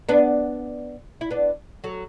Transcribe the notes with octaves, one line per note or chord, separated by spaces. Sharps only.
B3 D4
E4
B3 D4
F#3 A3